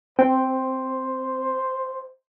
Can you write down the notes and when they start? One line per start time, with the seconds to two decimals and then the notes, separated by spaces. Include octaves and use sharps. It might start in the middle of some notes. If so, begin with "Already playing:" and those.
0.19 C4 C5 G5